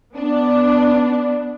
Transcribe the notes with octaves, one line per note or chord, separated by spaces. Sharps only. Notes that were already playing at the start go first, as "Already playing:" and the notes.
B3 D4